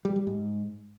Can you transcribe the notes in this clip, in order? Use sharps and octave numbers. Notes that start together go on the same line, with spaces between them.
G3
G3
G#2